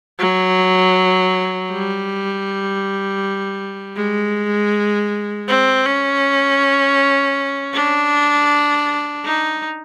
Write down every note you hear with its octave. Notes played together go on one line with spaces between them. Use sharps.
F#3
G3
G#3
C4
C#4
D4
D#4